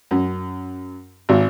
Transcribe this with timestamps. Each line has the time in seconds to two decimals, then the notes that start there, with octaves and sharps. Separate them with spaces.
0.11 F#2
1.29 G#1